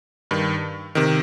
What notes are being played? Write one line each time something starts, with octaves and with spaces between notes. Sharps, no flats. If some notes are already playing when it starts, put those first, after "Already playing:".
G2 D#3
C3 D#3